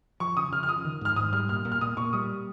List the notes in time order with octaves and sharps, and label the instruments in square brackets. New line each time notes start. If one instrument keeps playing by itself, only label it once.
[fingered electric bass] F3 [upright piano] C#6
[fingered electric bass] C#3 [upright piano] D#6
[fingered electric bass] C#3 [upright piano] F6
[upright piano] F6
[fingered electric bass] F3 [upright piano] D#6
[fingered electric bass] D#3
[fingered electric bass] G#2 [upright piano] F6
[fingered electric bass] G#2 [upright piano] D#6
[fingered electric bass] G3 [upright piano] F6
[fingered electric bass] A#2 [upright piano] F6
[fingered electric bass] A#2
[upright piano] F6
[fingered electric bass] A#2 [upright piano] D#6
[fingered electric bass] A#2 [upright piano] C#6
[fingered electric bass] G3 [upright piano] D#6